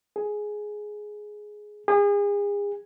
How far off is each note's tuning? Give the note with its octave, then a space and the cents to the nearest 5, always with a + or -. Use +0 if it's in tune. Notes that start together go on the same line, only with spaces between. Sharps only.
G#4 +10
G#4 -35